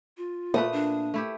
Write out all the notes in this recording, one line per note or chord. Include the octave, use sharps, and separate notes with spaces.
F4
A#2 A3 B4 D#6
D4
A3 E4 G4